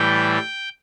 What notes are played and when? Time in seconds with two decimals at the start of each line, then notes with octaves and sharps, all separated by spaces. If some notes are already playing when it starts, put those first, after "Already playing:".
Already playing: A2 E3 G3 G5